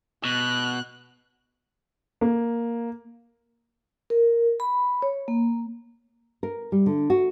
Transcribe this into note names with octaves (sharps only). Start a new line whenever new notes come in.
B2 F#6
A#3
A#4
B5
C#5
A#3
A#4
G3
D3
F#4